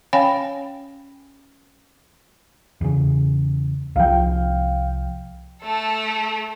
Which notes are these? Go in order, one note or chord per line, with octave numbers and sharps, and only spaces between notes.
C#4 C#5 F5 G5 G#5 B5
E2 C#3
C2 F3 F5 G5
A3 A4